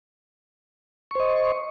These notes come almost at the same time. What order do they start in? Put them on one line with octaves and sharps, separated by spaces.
C#6 C5 D#5